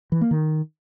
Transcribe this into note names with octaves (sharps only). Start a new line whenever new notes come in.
E3
A#3
D#3